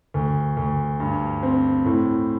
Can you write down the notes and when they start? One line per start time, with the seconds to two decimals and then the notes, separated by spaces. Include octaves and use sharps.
0.14 D2
0.57 D2
1.00 G2
1.43 C4
1.85 A2